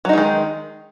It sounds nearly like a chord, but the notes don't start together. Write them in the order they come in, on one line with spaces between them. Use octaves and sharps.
F#3 D#4 G#3 D#3